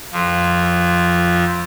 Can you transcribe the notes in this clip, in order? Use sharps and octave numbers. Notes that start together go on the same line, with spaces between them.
F2 F3